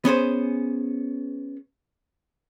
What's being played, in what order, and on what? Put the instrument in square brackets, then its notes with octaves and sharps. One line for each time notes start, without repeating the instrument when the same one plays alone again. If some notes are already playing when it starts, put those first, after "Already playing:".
[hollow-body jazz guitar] B3 C#4 G#4 C5